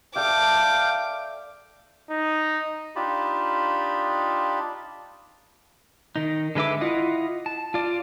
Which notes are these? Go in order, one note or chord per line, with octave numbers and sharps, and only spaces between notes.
A4 D5 E5 F5 G5 D6
D#4
D4 D#4 F4 G4 A5 B5
D#3 D#4
D3 G#3 B4 E5 D6
E4 F4 D#5 F#5
A5
F4 D5